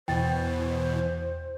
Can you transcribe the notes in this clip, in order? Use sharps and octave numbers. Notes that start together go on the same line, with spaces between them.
E2 B2 E3 C5 G5 A6